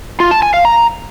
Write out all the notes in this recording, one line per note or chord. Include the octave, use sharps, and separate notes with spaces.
F4
A5
G#5
F5
A#5